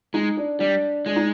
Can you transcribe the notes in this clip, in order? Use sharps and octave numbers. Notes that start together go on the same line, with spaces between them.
G#3 D#4
D4
G3 D4
G#3 D4
D#4